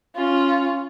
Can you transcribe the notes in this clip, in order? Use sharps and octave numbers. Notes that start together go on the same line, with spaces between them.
C#4 F4